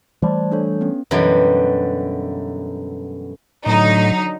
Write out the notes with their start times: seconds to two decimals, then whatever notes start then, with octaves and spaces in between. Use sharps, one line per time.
0.22 E3 G3 A3 C5 D5 A5
0.52 D4 A4 C#5
0.81 B3 C#4
1.11 F#2 B2 D3 E3 G3
3.66 A2 D3 F#3 D#4